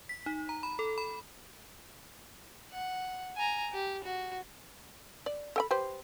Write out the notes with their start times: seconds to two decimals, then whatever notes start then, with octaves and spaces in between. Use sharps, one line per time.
0.09 B6
0.26 D#4
0.49 A#5
0.63 B5
0.79 A4
0.98 B5
2.72 F#5
3.36 G#5 A#5
3.73 G4
4.04 F#4
5.26 D5
5.56 A4 G5 B5
5.71 G4 B4 C5